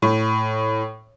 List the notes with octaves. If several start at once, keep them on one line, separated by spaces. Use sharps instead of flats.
A2